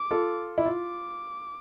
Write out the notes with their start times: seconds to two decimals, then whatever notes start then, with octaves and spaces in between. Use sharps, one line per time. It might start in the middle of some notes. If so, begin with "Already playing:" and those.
Already playing: D6
0.11 F4 A4
0.58 E4
0.66 F4 D6